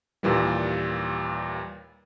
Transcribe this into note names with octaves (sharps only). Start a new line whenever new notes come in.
D#2 A#2 E3 G3